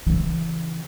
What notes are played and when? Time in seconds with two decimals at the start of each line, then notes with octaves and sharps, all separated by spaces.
0.07 C#3 E3